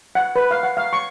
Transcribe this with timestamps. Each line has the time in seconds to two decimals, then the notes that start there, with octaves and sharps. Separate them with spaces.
0.15 F#5
0.36 B4
0.51 F5
0.63 F#5
0.77 F5
0.93 C#6